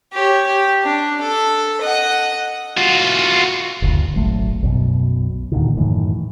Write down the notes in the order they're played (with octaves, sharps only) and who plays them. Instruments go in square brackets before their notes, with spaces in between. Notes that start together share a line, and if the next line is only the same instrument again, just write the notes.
[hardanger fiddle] G4 C#5
G4
D4
A4
D#5 F#5
[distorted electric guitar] F4 F#4
[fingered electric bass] F#1 D2
D#1 G#1 F#3 A3
B1 F#2 B2
D#2 A#2 D3 D#3
F#2 A2 D#3 E3